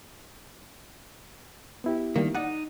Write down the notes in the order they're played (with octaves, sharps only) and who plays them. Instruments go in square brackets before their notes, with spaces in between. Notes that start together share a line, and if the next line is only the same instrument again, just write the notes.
[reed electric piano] B3 E4 G4
[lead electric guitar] D#3 [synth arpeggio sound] G3 A#3
[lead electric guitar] D#4 [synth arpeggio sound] D5 F#5 F#6